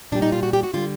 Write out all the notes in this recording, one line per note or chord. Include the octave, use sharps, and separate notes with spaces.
A#2 G3 D4
D#4
F4
F#4
G4
F#4
D3 G3 F4